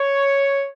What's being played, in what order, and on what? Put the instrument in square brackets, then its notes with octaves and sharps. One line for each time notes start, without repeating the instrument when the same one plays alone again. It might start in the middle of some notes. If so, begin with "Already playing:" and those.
Already playing: [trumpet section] C#5